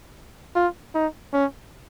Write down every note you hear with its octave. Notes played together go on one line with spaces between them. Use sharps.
F4
D#4
C#4